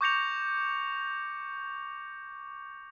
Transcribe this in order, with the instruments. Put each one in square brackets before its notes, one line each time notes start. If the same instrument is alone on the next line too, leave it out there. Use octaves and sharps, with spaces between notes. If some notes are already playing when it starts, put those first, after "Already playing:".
[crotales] C#6 D6 G6 A#6 C#7 F7